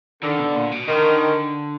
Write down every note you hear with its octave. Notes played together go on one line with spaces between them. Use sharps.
D3 D#3
B2
A#2
B2
D3 D#3